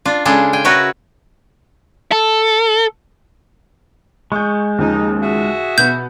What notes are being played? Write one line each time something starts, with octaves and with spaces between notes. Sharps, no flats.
D4 F4
C#3 G#3 D4 G#4 A4
G5 G#5
F#4 A#4 B4 C#5 E5
A4
G#3 C#6 G6
D#2 C#3 F3 D#4
F#4 G#4 E5
B2 B3 G6